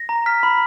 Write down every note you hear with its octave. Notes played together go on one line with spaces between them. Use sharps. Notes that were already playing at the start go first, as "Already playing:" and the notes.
Already playing: A#6
A#5
F6 B6
B5